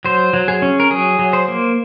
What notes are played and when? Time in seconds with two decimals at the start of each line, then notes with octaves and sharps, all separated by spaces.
0.05 F#3 C5
0.33 F#3
0.48 G#4
0.62 C#4
0.80 A#4
0.90 F#3 G#4
1.19 F#3
1.33 C5
1.48 A#3